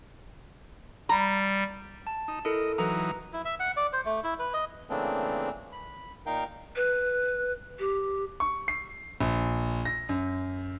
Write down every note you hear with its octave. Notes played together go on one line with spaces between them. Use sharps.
G3 A#5
A5
D#4
E4 A4 A#4 D#5
E3 F#3 D#4 B4 A#5
E4
E5
F#5
D5
C5
A3
E4
B4
D#5
C#3 E3 A3 A#3 C4 D4
B5
A#2 D#4 A#4 F5 G5
B4
G4
C#6
C7
A#1
A#6
F#2